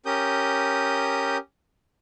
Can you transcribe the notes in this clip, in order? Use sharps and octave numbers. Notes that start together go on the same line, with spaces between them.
C#4 G4 A#4 D#6 G6